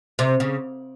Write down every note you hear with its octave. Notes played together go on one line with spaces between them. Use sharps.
C3
C#3